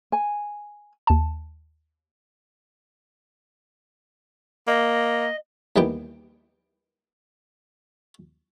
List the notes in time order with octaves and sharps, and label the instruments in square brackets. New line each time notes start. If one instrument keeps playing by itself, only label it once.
[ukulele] G#5
[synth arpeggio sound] D#2 A5
[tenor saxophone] A#3 [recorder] D#5
[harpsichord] D#2 E3 G3 B3 G5